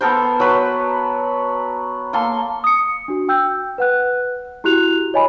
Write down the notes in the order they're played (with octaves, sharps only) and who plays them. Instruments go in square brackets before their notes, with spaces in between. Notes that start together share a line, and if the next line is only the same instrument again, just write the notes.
[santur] B3 A4 A#4 C5
F#3 B4
A#3 A4 C6
[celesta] D#6 C#7
D4 F#4
G5 E6 G6
B4 F#5 F#6
E4 F#4 G4 F#6 F7
C#5 D#5 G#5 B5